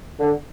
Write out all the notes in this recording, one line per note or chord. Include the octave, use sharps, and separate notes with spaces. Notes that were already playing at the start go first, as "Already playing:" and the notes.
D3